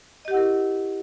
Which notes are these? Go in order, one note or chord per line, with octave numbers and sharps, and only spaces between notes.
E4 G4 A#4 D#5 F#5